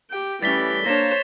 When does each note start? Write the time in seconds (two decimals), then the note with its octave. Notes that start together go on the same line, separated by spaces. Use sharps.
0.11 G4 G5
0.42 E3 G3 A3 C#4 G4 A6 B6 G7
0.86 A#3 D4 C5 C#5 A#6 E7